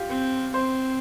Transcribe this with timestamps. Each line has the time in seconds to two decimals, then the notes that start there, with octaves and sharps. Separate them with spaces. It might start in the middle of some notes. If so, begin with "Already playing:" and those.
Already playing: F4 G4
0.09 C4
0.54 C4 C5